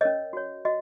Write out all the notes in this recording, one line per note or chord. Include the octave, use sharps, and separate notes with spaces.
C#4 A#4 C#5 D#5
F#4 C#5
F#4 D#5